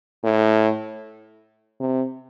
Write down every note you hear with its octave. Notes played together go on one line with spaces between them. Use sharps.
A2
C3